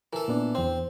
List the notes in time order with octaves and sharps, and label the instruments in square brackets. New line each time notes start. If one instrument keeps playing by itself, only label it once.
[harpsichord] E3 A4 [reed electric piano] A#4
[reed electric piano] A#2 B3 D4
[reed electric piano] E2 C5 [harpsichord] C4